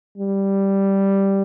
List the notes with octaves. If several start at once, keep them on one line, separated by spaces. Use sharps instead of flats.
G3